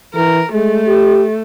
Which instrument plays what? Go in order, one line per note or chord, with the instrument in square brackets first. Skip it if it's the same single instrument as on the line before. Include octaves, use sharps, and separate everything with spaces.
[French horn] E3 [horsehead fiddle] A#4
[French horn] G#3 [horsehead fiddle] A3
[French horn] G4